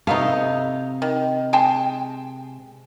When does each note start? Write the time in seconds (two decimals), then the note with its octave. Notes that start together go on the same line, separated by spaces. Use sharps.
0.07 C3 A3 B3 D#4 F5
1.02 D#3
1.53 G#3 G5 A5